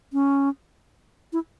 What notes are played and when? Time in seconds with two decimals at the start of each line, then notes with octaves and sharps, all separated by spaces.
0.13 C#4
1.33 E4